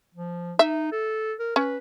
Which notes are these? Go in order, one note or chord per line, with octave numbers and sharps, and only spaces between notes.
F3
D#4 E5
A4
A#4
C#4 B4